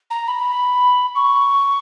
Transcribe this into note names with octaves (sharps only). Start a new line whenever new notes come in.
A#5
B5
C#6